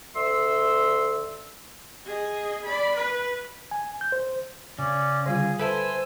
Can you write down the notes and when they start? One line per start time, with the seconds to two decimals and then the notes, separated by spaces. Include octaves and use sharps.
0.16 D2 E5 C6 E6
2.05 G#4 D#5
2.65 D5 B5
2.96 B4
3.71 G#5
4.01 G6
4.12 C5
4.78 C#3 C#4 D5
5.26 D3 G3 F4 G#4
5.59 A4 B4 C5 E5 G#5 A5 E6